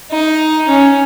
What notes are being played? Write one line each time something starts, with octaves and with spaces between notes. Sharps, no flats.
D#4
C#4